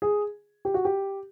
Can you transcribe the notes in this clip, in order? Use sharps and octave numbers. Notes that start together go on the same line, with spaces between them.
G#4
G4
F#4
G4